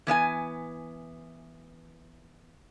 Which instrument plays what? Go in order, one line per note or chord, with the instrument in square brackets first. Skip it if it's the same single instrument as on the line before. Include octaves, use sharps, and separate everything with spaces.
[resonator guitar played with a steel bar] E3 B3 E5 G#5